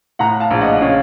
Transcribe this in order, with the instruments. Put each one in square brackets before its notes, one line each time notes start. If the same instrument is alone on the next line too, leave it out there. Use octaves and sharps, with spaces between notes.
[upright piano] A2 F#5 A#5
F5 A5
A#1
D#5 F#5
C#3 C#5 F5